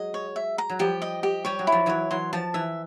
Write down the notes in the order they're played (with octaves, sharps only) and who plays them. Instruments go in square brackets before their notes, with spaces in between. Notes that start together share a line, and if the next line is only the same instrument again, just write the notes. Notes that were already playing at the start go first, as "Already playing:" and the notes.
Already playing: [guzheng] F#3 G#3 [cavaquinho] D#5
[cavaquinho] C#5
E5
A#5
[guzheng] F#3
[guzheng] F3 G3 [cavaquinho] G4
[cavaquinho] D#5
G4
[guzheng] G3 [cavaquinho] C#5
[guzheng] F#3
[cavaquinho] E4
[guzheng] F3
[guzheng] E3 F#3 [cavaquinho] C#5
[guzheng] E3 F#3 [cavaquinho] C6
[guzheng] F3 [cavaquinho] A5
[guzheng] E3 [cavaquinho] E5